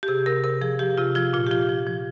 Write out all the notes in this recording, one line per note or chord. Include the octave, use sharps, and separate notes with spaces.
G4
C3 G#4
C3 A#4
C3 A#4
F3 G#4
F3 G4
C3 F4
F3 F4
A#2 F4
G4
F3 F4
F3
F3